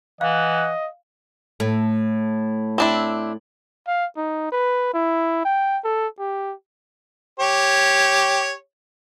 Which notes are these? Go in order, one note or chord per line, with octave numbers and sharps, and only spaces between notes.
E3 D#5 F5 F#5
A2 A3
C4 D4 E4
F5
D#4
B4
E4
G5
A4
G4
G4 C#5